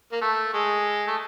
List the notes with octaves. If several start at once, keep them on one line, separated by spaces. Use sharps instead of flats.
A#3
A3
G#3
A3